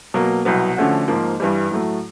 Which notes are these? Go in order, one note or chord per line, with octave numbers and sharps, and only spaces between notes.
B2 F#3 A#3
C2 B2 F#3 B3
D3 F3 A3 C#4 F#4
G#2 F3 A#3
G2 E3 G3
A2 F#3 A3